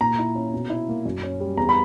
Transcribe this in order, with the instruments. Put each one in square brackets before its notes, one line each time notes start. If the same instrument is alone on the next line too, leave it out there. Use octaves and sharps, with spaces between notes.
[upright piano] A#2 [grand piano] A#5
[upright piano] E4
C#4
B2
E4
A#3
F#2
C#4
G3
[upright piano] E2 [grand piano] A#5
[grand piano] B5